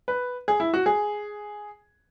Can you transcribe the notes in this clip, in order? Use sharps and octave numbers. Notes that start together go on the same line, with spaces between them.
B4
G#4
E4
F#4
G#4